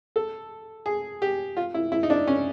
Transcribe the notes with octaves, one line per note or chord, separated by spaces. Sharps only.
A4
G#4
G4
F4
E4
E4
D#4
D4
C#4